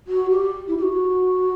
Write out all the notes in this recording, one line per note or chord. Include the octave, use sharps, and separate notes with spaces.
F#4
G4
E4
G4
F#4